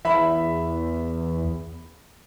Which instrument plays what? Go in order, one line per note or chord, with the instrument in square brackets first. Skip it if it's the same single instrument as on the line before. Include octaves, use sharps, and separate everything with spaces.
[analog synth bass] E2 [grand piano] E5 B5